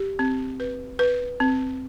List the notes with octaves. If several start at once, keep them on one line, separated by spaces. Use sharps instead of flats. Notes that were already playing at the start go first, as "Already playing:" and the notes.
Already playing: G4
C4
B4
B4
C4